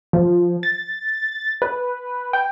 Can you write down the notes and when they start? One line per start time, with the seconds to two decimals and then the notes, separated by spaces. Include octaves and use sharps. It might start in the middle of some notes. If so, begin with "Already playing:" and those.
0.13 F3
0.63 A6
1.62 B4
2.33 G5